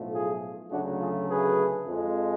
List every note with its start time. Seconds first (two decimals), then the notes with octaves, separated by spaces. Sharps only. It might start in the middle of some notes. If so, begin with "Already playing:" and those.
Already playing: B1 A2 F3 A3
0.12 F4 G#4
0.71 D2 C#3 F#3 A3 D4 F#4
1.00 F4 G#4
1.29 G#4 B4
1.87 F2 F3 G#3